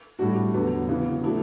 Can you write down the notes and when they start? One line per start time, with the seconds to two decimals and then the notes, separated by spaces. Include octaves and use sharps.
0.19 A2 G3 D4 F#4
0.54 E2 D3 F#3 B3
0.89 C#3 E3 B3
1.24 F#3 A3 D4 E4